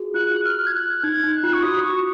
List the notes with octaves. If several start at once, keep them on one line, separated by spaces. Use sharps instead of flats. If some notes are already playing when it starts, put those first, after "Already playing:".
Already playing: F4 F#4 G#4
F4 F#6
F6
G#6
F#6
D#4 G#6
D#4
F#6
F4
C#6
F#4 D#6
C#6